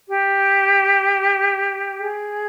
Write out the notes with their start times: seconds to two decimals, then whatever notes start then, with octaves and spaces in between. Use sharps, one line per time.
0.09 G4
1.98 G#4